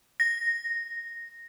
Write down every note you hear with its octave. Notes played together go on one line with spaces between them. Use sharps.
A#6